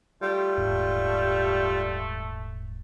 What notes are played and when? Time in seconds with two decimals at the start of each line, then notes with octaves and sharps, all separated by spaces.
0.22 G3 A3 F4
0.58 D#1 E2 G#2